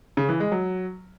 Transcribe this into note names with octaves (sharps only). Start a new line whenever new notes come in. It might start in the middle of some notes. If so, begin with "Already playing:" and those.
C#3
E3
G#3
F#3